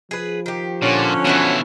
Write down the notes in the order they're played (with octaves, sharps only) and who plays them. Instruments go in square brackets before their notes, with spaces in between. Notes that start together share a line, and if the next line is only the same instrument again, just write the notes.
[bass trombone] F3 [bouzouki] G#4 B4
[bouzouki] D#3 G4
[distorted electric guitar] A#2 [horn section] D3 C#4
[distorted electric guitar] B2 E3 [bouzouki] E4 F#4 F#5